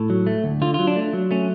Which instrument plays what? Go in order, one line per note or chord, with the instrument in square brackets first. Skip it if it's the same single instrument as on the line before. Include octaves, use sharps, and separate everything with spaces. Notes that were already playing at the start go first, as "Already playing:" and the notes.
Already playing: [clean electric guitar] A2 A4
F#3
A3
D2
D3 F4
F#3 F4
D4
A3
F#3
A3 C#4